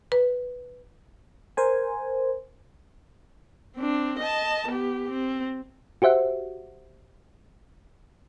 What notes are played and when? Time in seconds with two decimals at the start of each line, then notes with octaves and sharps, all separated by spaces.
0.12 B4
1.57 A#4 C5 G#5
3.77 C4 D4
4.19 D#5 A5
4.68 B3 G4
5.10 C4
6.02 F#4 G4 C5 E5 F#5